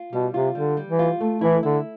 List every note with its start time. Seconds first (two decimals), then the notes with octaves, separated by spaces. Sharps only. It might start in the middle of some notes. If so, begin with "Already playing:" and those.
Already playing: F4
0.13 B2 G3
0.34 C3 F4
0.55 D3 G3
0.77 G3
0.87 E3
0.99 F4
1.20 A3
1.41 E3 E4
1.63 D3 E4